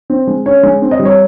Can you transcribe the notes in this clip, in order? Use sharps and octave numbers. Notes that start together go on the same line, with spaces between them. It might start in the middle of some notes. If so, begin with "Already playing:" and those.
C4
G#3
C#4 C#5
G#3
C4
D#5
G3
C#5